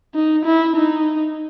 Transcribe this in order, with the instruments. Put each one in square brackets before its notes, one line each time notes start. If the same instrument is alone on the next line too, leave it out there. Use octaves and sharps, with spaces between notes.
[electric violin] D#4
E4
D#4